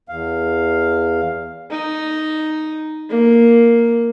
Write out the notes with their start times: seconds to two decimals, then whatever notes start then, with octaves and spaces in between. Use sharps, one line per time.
0.09 E2 F5
1.70 D#4
3.10 A#3